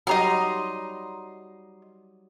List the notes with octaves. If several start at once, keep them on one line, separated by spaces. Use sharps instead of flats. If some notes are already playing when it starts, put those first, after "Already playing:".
F#3 G3 D#4 D#5 A#5 C6